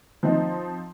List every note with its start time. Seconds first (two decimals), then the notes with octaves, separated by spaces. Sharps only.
0.23 F3 C4 D#4